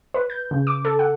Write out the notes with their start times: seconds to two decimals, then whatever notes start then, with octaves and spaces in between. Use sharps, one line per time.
0.14 B4
0.30 G6
0.51 C#3
0.67 D6
0.85 A4
0.99 F#5